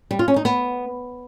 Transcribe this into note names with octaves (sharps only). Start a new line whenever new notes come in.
G3
F4
C#4
D#4
B3